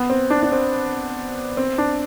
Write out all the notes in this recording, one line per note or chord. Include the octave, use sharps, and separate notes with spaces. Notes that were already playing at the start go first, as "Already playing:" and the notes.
Already playing: B3
C4
D4
D4
C4
C4
D4